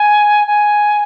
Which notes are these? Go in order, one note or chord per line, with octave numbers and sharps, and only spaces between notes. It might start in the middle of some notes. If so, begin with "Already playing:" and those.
Already playing: G#5
G#5